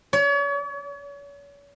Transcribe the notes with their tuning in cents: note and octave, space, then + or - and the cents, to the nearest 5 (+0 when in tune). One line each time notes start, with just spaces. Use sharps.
C#5 +40